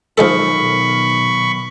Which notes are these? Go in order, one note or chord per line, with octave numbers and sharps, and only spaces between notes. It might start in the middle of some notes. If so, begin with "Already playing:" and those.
B1 D#3 F3 G#3 A4 B5 C#6
B2